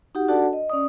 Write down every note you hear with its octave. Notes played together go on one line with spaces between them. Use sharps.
D#4 F#4 G4 F#5
D4 F#4 A4 D5 F#5 A5
D#5
C#4 D5 D#6